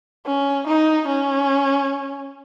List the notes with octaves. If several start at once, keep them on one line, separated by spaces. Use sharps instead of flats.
C#4
D#4
C#4